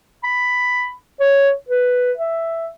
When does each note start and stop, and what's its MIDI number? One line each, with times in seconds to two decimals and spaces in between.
0.24 0.90 83
1.20 1.50 73
1.69 2.12 71
2.17 2.68 76